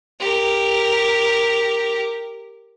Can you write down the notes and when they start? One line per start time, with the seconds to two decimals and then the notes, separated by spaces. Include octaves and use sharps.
0.20 G4 A#4